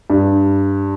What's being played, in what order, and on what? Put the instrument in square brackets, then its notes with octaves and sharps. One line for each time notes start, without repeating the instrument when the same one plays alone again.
[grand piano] G2